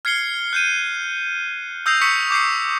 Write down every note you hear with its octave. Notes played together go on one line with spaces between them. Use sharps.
F6 G#6 C7 C#7 G7
F#6 G6 D#7
D#6 E6 G6 A#6 C7 F7
C#6 D#6 E6 G6 B6 C#7
D6 G6 C7 C#7